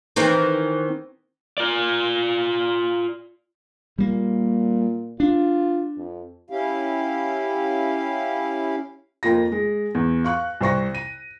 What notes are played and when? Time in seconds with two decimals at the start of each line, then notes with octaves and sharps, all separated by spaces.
0.16 D#3 E3 C4
1.58 F4 D5
3.99 A#2 G3 A#3
5.20 D4 F4
5.97 F2
6.50 C#4 E4 G4 F5
9.23 F2 A#3 F4 A#6
9.52 G#3
9.95 E2
10.24 F5 C#6 F#6
10.61 C2 C5 C#6 A#6
10.95 D#7